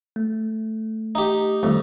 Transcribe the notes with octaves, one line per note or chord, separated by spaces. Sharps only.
A3
D#4 G4
F2 D#3 G3 A3